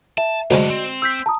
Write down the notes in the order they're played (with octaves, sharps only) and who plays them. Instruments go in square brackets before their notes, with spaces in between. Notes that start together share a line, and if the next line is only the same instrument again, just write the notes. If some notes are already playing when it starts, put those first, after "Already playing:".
[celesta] E5 [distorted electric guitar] A5
[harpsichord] D2 F3 G#3 [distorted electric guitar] F#3 D4 [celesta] F#4 D5 D#5
[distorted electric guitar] C4
[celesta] E6 G6 B6
A5 A#5 D#6